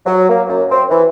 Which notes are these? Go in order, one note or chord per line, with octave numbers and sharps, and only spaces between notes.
F#3
A#3
F#2
C4
E3